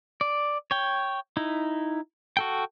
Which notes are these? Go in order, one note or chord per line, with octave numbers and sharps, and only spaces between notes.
D5
C#5 G5
D#4 E4
F#4 A4 G5